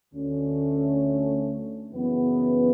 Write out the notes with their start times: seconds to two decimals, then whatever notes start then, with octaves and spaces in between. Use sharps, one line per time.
0.13 D2 D3 A3 C#4
1.92 F#2 C#3 E3 B3